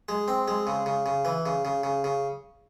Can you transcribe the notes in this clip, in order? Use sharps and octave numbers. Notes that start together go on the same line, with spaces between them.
G#3
C4
G#3
C#3
C#3
C#3
E3
C#3
C#3
C#3
C#3